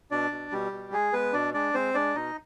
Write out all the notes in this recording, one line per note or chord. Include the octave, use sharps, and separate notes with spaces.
B2 D4 D5
B2
B2 G3 G4
B2
G#3 G#4
G#3 B3 B4
B2 D4 D5
G#3 D4 D5
G#3 C4 C5
G#3 D4 D5
B2 D#4 D#5